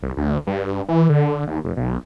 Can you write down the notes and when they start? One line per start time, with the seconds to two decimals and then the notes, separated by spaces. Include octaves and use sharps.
0.03 C2
0.17 D2
0.47 G2
0.89 E3
1.09 D3
1.47 D#2
1.64 F1
1.77 B1